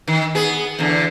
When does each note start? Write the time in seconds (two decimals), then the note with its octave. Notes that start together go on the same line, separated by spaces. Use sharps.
0.08 D#3
0.35 B3 G#4
0.79 E2 D3